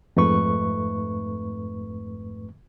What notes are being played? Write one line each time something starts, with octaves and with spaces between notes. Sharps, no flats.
F2 G#2 A3 B4 C#6